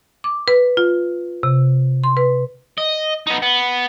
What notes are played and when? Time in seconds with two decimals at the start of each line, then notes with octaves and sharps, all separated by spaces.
0.24 D6
0.48 B4
0.77 F4
1.43 C3
2.04 C6
2.17 B4
2.78 D#5
3.27 B3 D#4
3.42 B3